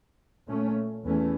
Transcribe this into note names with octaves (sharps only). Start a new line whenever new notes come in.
A#2 A3 C#4
E2 E3 A3 C#4